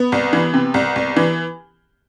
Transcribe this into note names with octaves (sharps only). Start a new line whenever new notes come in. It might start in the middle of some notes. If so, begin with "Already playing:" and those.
Already playing: B3
C2
E3
C3
C2
C2
E3